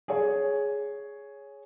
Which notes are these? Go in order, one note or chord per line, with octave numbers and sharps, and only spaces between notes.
G#4 C#5